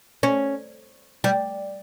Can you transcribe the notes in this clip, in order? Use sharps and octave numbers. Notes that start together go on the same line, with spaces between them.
C#4
G3